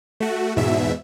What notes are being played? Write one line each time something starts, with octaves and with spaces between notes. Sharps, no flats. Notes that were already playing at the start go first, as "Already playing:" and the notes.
A3 F#4
E2 G#2 B2 E5